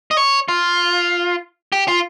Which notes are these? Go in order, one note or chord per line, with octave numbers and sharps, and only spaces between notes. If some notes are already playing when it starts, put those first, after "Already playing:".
D#5
C#5
F4
G4
F4